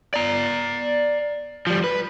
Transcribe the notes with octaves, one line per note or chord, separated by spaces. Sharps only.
D5 A#5
F3 G3
B4